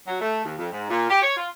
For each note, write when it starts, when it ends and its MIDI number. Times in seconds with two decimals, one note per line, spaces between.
0.07 0.19 54
0.21 0.42 57
0.45 0.54 39
0.58 0.70 41
0.71 0.88 44
0.90 1.07 46
1.10 1.22 67
1.22 1.35 73
1.36 1.47 65